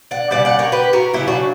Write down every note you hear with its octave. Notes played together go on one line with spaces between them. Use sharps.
D5 F#5
C#3 G3 D5 F#5
D5 F#5
A#4 C#5
G4 B4
F#4 A#4
C#3 F#3 E4 G4
D4 F#4